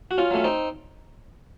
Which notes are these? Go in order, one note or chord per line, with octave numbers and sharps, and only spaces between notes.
F#4
C#4 F4
F#3 A3 C#4
C4 D#4